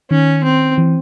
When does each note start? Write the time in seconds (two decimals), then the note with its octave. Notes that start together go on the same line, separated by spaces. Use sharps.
0.10 D#3 C#4
0.44 C4
0.78 E3